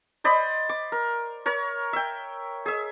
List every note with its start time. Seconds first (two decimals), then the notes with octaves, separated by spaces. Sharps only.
0.24 C5 D5 D#5 B5
0.69 D6
0.92 A#4
1.46 A#4 C#5
1.93 E5 G5
2.66 G#4 E5